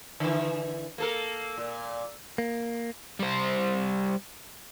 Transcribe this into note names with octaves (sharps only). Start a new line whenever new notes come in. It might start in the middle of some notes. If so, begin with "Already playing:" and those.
D3 E3
A#3 A4 A#4
A#2
A#3
G3 C5